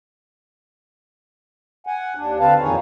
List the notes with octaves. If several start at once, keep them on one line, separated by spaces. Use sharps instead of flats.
F#5 G#5
D#2 D4
D3 C4 B4 F5 A5
F2 A#2 D#3 D#4 G#4 C#5